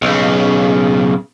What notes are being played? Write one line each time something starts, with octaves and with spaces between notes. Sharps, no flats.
B1 C#3